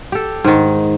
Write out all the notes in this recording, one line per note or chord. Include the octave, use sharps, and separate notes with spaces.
G4 A4
G#2 D#3